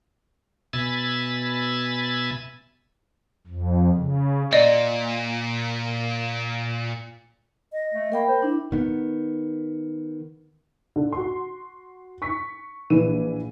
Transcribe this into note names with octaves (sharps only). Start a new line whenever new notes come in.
B2 E5 G#5 B5 A6
F2
C#3
A#2 D5 D#5
D#5
A3
A#3 A#4 G5 B5
C5
D4 E4
D#3 B3
D3
F#4 C6
C#6 B6
A#1 E3 B4 D#7